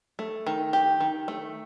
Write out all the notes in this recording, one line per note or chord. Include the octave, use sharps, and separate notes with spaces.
A3
D#3
G4
D#3
A3